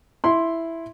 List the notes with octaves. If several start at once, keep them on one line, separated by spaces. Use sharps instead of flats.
E4 C6